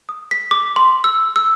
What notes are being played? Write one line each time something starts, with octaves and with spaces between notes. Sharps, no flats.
D#6
B6
D6
C6
E6
E6